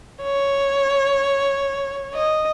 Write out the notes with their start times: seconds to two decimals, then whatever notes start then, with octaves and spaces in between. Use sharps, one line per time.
0.23 C#5
2.14 D#5